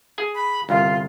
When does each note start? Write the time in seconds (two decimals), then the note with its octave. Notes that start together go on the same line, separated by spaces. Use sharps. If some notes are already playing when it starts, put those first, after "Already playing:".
0.18 G#4 G#5
0.35 B5
0.69 G1 C2 F4